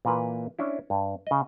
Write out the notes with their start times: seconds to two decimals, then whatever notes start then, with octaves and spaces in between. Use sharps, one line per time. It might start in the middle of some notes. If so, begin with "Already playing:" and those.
0.05 A#2 E3 A#3 B4
0.59 C#4 D4 E4
0.90 G2
1.27 C#3 D#5